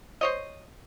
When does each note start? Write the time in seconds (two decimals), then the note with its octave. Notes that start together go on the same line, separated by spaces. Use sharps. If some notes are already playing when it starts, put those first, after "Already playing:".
0.21 C5 C#5 D#5